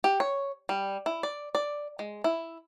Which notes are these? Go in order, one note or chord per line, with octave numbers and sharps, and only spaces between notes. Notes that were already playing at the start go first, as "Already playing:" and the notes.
G4
C#5
G3
E4
D5
D5
G#3
E4